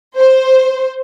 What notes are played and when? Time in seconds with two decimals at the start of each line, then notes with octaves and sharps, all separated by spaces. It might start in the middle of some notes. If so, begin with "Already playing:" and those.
0.18 C5